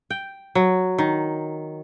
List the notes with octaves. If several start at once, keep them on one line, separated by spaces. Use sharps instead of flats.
G5
F#3
D#3